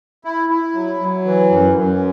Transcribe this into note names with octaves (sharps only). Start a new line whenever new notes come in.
E4
E4
F#3
F#3
E3
F#2
F#2